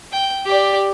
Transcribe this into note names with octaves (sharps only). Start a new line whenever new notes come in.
G5
G4 D5